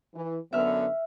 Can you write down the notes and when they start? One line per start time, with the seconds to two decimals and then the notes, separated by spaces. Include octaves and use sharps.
0.15 E3
0.53 F#2 D3 B3 E5 F6